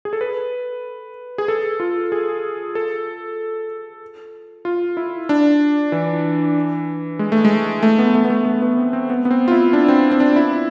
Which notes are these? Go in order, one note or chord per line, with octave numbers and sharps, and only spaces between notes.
G#4
A4
B4
G#4
A4
F4
G#4
A4
F4
E4
D4
E3
G#3
A3
G#3
A3
B3
A3
B3
A3
A3
B3
C4
C4
B3
B3
C4
F4
E4
D4
C4
C4
D4
E4